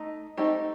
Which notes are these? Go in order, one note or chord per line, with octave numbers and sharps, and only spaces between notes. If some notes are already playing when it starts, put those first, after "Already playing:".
Already playing: A3 D#4
A3 C4 D#4 G4